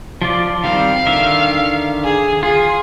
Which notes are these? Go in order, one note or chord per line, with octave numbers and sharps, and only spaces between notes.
F3 F4 D5
D#3 G3 C4 F5
D3 D#3 E5
G#4
F4 G#4